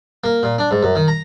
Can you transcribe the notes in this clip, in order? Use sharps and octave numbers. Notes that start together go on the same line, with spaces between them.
A#3
A#2
D4
G#2
F#2
D#3
A#5